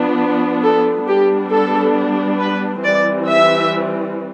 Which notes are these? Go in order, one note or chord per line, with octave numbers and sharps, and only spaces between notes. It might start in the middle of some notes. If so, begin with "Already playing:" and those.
Already playing: F3 B3 D4
A4
G3 B3 D4 G4
A4
B4
E3 G3 C4 D5
E5